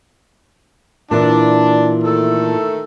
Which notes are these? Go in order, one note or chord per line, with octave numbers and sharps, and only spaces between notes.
A#2 E3 D4
D#3 A3 A4